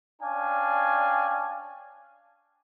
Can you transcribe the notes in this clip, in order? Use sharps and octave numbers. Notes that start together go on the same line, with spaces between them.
C#4 D4 D5 F5 G5 G#5